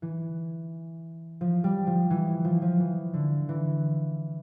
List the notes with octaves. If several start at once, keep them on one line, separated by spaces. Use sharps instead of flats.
E3
F3
G3
F3
E3
F3
F3
E3
D3
E3